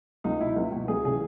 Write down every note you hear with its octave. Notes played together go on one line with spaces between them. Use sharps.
C#2 D#4
B2 E4
C#2
B2
C#2 G#4
C#3 E3 G#4